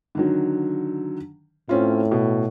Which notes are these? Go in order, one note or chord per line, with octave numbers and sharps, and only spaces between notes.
D3 D#3 F#3
A2 C4 C#4 F4
B2